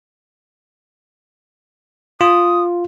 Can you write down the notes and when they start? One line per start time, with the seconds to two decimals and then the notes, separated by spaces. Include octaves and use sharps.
2.21 F4 D#6